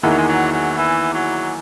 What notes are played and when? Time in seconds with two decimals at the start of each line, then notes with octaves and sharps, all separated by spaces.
0.03 E2 D#3 G#3 A#3 E4
0.10 F#3
0.18 G#3
0.28 F#3
0.53 F#3
0.78 E3
1.14 F#3